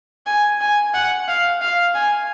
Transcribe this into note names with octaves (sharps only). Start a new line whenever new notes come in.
G#5
G#5
F#5
F5
F5
G#5